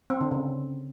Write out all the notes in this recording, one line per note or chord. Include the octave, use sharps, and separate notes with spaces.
C4
D3
C#3